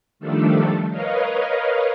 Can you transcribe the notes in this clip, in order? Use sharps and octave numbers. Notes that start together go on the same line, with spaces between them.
D#3 F3 G3 A3 D4 A4
A#4 B4 C#5 D#5 F5